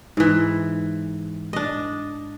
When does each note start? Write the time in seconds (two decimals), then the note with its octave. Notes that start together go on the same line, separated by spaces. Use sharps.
0.17 G#2 E3
1.53 D4 D#5